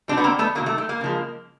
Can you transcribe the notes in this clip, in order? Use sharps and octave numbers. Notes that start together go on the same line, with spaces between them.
B2 G3 C4 D4
B3
A#3 C4
A3 B3
C3 D#3 F#3 A#3
A3
A3
A#3
C#3 F3 G#3